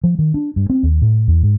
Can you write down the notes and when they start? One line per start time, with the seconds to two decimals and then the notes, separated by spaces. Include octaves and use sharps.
0.04 F3
0.19 D#3
0.34 D4
0.56 G2
0.70 C4
0.83 D#2
1.02 A2
1.28 E2
1.43 G#2